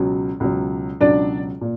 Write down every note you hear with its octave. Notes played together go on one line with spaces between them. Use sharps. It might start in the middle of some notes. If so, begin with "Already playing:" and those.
Already playing: C#2 B2 F#3
C#2 B2 F#3
C#2 B2 F#3 D4 D5
A#2